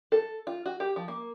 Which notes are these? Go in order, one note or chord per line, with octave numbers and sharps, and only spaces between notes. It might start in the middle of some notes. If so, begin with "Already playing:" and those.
A4
F4
F#4
G4
F3
A#3